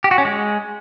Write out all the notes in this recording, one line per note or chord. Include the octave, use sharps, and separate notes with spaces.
G4
F#4
C#4
G#3